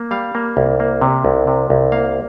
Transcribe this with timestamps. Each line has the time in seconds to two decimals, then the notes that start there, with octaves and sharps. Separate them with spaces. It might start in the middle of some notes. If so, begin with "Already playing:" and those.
Already playing: A#3
0.11 G3 F5
0.35 A#3
0.57 C2
0.80 A#3
1.01 C3
1.25 C2
1.47 C3
1.70 C2
1.92 A#3 F5